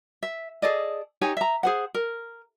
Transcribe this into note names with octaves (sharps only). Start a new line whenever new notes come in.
E5
G#4 A4 D5 D#5
D#4 G4 C#5 G#5
E5 A#5
G#4 C5 F#5
A#4